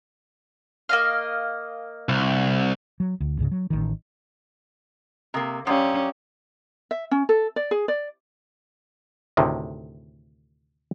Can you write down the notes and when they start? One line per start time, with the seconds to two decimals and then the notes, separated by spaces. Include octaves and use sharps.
0.89 A#3 D#5 F5
2.09 C2
3.00 F#3
3.20 D2
3.38 C#2 G#2 C#3
3.51 F#3
3.70 A1 D#3
5.34 C3 A#3 A#5 D#6
5.67 F#2 C#4 G4 D5 F5 A#5 D#6
6.91 E5
7.11 C#4
7.29 A4
7.56 D5
7.71 G#4
7.88 D5
9.37 D2 A2 C3 D#3